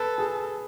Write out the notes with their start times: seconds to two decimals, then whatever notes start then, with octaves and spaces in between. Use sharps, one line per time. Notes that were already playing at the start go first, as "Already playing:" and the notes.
Already playing: A4 B4
0.18 G#4